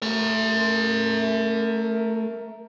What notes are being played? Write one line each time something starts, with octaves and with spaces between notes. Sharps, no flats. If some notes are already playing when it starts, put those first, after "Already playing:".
A3 A#4 E5